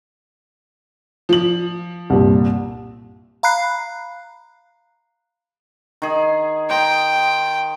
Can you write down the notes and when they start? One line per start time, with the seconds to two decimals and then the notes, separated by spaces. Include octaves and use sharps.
1.29 F3 F#7
2.10 C2 G2 A#2
3.43 F5 A#5 B5 F#6 C7
6.02 D#3 G#4
6.70 C5 G5 A#5